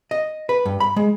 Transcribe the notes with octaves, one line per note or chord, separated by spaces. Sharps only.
D#5
B4
G2
B5
G#3